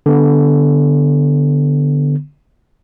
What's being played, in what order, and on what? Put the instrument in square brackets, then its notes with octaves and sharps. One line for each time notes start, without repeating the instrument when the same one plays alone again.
[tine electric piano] D3 B3